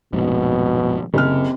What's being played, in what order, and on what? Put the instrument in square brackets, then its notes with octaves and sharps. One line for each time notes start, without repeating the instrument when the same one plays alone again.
[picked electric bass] A#1 F2 G#2 [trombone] B2
[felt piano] F#1 F6 [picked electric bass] C3